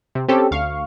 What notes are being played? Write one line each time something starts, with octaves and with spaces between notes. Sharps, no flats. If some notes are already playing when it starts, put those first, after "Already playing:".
C3
C4 C#4 G4 A4
D2 F5 C#6